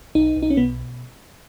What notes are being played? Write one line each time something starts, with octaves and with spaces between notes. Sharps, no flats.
B1 D#4
B1
D#4
C#4
B2 B3